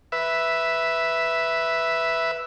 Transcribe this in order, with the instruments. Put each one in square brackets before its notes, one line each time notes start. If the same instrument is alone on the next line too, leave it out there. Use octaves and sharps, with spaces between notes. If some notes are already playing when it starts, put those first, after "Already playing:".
[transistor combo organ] B4 E5